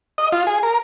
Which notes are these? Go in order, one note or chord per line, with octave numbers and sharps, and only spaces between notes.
D#5
F4
G#4
A#4